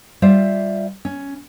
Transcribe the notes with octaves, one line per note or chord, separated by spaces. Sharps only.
G3 F4 C5 E5 F5
C#4